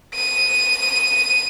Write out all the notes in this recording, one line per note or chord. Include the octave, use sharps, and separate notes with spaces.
D#7